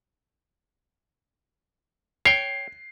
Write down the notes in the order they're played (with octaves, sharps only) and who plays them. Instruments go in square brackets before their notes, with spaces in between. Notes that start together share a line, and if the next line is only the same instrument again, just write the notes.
[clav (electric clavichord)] C#5 G5 [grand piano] C7